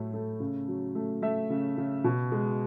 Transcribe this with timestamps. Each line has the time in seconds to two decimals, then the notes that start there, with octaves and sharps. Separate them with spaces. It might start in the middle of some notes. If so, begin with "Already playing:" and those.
Already playing: A2 F#3 A3
0.14 A3
0.40 C#3
0.67 F#3
0.95 A3
1.22 A3 E5
1.50 C#3
1.78 C#3
2.04 B2
2.32 G#3